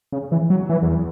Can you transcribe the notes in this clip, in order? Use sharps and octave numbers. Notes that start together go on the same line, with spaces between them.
C#3
E3
F#3
E3
E2